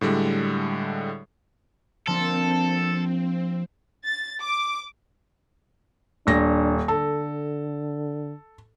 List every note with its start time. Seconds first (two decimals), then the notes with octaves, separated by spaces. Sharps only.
0.01 A2 D3 G3 G#3
2.07 F3 A#3 C4 D4 A4
4.05 A6
4.40 D6
6.27 D#1 D4 A#6
6.88 D3 A4